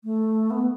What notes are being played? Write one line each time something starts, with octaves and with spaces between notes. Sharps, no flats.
A3
B3